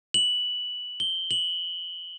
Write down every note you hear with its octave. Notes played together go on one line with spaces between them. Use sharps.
F#7
G7
F#7